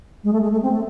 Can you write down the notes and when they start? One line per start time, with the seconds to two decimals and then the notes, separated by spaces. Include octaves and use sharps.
0.24 G#3
0.33 A3
0.43 G#3
0.52 A3
0.63 C4
0.71 A3